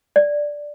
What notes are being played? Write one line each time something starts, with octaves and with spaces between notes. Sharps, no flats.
D5